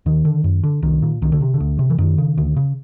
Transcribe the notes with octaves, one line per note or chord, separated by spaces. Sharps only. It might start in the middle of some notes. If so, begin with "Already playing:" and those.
D#2 D#3
D3
F#2
D3
C2 D#3
A#2
C2 D#3
D3
C3
D3
D2
C3
E3
F#2 D#3
C#3
D2
C#3